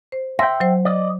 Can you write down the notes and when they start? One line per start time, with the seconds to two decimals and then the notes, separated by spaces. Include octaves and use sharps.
0.12 C5
0.39 E5 G5 C6 A#6
0.60 F#3 C5
0.85 D5 D#5